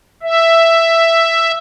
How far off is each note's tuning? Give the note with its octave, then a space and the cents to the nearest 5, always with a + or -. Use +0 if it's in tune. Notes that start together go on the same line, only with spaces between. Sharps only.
E5 +5